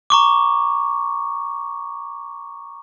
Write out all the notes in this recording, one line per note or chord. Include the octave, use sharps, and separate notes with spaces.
A#5 C#6 D6